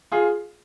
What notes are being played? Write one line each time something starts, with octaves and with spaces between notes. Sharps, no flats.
F4 G#4